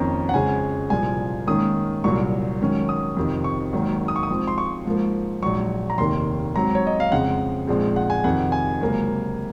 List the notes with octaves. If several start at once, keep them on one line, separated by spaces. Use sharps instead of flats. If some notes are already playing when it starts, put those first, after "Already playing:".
Already playing: F2 D#3 A#3 C#4 A#5
F#5
F2 C#3 G#3 C#4 G#5
C2 A#2 F3 G#5
G#2 D#3 A#3 C#4 D#6
C2 A#2 F#3 C#6
G#2 D#3 F#3 C#4
D#6
F2 C3 D#3
C#6
G#1 G#2 D#3 F#3 A#3
D#6
C#6
D#6
G#2 F3 C4
C6
C#6
G#2 F3 A#3
A#1 G#2 F#3 C#6
A#5
F1 D#2 D#3 A#3 C6
G#2 F#3 C4 A#5
C#5
D#5
F5
F2 C#3 G#3 C4 F#5
A#1 G#2 F3 G#3 C4
F#5
G#5
F2 C3 D#3 F#5
G#5
C#2 C3 F#3 A#3